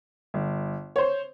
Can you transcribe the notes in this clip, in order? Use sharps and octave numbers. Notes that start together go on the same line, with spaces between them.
G1
C5 C#5